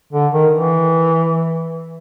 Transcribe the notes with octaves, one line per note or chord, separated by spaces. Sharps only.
D3
D#3
E3